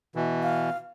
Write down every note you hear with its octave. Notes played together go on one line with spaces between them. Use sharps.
B2 E3
F5